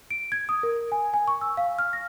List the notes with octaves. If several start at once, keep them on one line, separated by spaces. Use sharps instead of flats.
D7
G#6
D#6
A#4
G#5
G#5
C#6
E6
F5
F6
A#6